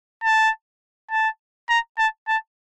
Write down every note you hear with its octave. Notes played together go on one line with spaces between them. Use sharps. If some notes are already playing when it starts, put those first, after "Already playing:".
A5
A5
A#5
A5
A5